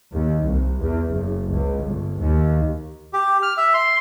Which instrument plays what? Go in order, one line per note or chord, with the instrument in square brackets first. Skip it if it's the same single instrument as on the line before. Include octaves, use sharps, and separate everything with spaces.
[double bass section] D#2
C2
E2
F#1
C#2
G1
D#2
[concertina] G4
F6
E5
C6